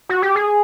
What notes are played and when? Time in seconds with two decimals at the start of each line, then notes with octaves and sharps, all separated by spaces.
0.09 F#4
0.22 G4
0.35 G#4